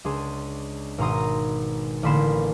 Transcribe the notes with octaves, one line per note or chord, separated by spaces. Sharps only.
C#2 D4 G#4 C6
G#1 B2 A#5 C6 D#6
A1 D3 A#3 B5 C6 E7